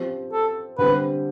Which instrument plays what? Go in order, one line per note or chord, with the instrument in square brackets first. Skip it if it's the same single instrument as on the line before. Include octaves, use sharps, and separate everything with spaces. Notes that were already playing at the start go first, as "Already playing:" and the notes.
Already playing: [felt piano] F3 C4 G4
[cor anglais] A4
[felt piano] D3 G3 C4 G4 [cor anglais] B4